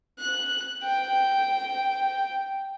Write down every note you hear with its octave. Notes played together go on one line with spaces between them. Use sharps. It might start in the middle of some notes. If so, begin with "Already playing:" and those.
F#6
G5